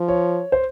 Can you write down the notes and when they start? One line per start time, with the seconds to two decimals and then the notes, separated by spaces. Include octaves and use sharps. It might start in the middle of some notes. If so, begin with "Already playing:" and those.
Already playing: F3
0.08 C#5
0.52 C5